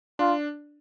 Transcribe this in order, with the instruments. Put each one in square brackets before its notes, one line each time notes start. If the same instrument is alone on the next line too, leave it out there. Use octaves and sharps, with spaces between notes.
[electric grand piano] D4 [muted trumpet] F4